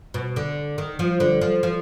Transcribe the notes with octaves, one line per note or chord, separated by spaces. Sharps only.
B2
D3
D#3
F3
D3
F3
F3